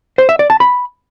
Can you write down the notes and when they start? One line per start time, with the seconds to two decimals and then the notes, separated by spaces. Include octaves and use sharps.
0.18 C5
0.29 E5
0.39 D5
0.50 A5
0.60 B5